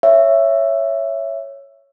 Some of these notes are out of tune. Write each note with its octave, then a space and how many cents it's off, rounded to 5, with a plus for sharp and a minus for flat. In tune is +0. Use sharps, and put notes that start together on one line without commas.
C#5 +0 E5 +10